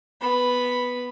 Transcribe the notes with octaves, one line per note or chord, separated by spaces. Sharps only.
B3 B5